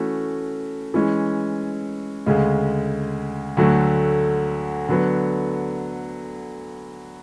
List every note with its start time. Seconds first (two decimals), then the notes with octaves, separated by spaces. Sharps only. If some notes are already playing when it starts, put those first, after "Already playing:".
Already playing: E3 A3 C#4 F#4
0.94 E3 G#3 C#4
2.26 D2 C#3 G#3
3.57 D2 D3 F#3 A3
4.89 D3 F#3 B3